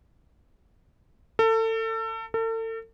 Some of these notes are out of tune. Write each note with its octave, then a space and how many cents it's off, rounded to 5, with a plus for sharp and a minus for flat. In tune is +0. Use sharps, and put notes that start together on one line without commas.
A4 +30
A4 +40